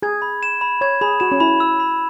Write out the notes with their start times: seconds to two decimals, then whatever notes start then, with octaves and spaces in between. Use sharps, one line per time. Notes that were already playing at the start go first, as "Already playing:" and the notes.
0.02 G#4 G#6
0.22 B5
0.43 E7
0.61 B5
0.81 C#5 G#6
1.01 G#4 B5
1.20 F#4 E7
1.32 C#4
1.40 E4 B5
1.60 E6
1.80 B5